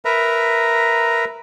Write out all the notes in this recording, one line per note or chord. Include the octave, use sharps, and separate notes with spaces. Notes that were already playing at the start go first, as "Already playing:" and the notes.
A#4 B4 E5 A#5